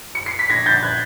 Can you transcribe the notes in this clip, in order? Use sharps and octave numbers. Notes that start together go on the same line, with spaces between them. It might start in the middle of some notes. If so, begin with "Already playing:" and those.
C#7
C7
B6
A#1 G#6 A#6
A#1 G6 A6
F#6 G#6